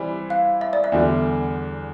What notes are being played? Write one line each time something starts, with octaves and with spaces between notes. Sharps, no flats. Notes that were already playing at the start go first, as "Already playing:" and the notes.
Already playing: E3 G3 C4 E4
F5
E5
D5
E5
E2 D3 G3